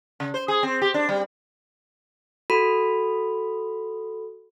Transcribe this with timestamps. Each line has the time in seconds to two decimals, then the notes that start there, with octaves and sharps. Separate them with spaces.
0.20 C#3
0.34 C5
0.48 G#4
0.63 C4
0.82 G4
0.94 D4
1.09 G3
2.50 F#4 A4 B5